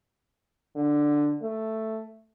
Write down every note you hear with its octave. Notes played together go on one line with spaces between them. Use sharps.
D3
A3